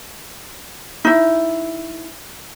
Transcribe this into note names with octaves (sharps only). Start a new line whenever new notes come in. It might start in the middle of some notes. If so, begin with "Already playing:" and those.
D#4 E4